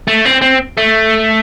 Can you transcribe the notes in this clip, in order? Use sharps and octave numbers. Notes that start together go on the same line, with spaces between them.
A3
C4
C4
A3